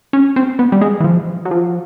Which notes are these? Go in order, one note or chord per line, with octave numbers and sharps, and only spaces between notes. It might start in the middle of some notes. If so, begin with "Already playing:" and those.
C#4
C4
B3
G3
G#3
E3
F3
F#3
F3